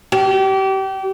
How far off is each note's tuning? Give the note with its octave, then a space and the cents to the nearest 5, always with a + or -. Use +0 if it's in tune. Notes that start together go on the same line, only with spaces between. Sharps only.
G4 -30